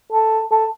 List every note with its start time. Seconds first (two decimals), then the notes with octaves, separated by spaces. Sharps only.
0.12 A4
0.51 A4